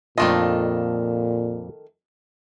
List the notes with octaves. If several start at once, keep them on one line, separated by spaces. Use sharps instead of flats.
F2 A#2 D#3 A3 D4 F4 D#5